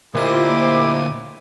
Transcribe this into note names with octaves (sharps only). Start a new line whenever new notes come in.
D2 A#2 E4 G4 C5 D#5 D6 D#7